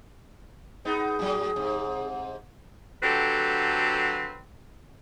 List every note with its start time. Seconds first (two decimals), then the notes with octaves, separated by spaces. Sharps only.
0.85 B3 D#4 G#4
1.19 A2 F#3
1.56 G#2 C3
3.02 D3 F#3 C4 G4 A4 B4